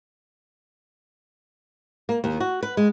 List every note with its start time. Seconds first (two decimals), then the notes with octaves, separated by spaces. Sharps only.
2.09 A#3
2.24 D#2
2.40 F#4
2.63 B4
2.77 G#3